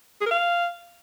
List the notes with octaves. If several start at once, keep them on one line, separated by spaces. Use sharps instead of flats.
G#4
A#4
F5